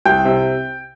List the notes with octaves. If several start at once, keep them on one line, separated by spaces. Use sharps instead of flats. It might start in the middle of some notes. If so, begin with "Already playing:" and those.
C2 G5
C3